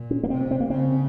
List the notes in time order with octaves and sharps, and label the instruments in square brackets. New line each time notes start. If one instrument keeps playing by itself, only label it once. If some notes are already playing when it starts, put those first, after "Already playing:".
Already playing: [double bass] A#2
[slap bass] C#4
A#3
[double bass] C3 [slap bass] C4
[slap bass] C4
A#3
[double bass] C#3 [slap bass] C4